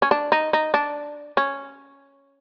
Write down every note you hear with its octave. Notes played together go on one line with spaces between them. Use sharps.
C#4
D4
D#4
D#4
D4
C#4